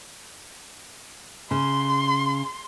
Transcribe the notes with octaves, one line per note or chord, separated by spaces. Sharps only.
C#3 C6